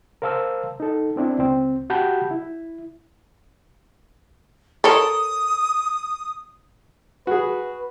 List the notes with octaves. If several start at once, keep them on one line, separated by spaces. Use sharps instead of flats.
A#4 C5 F5 A5 E6
D#4 A4
B3 C4 D4 E4
C#2 C4
F#4 G4 F#5 A5 B5 G6
E4
A4 A#4 C#5 D#6
F#4 G#4 B4